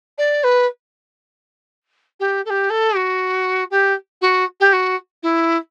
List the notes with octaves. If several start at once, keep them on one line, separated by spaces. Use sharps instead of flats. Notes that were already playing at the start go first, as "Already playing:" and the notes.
D5
B4
G4
A4
G4
A4
F#4
G4
F#4
G4
F#4
E4